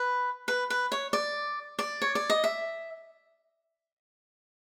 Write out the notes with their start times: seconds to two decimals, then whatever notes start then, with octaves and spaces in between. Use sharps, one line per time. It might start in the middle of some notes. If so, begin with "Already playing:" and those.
Already playing: B4
0.48 B4
0.70 B4
0.92 C#5
1.13 D5
1.79 D5
2.02 C#5
2.15 D5
2.30 D#5
2.44 E5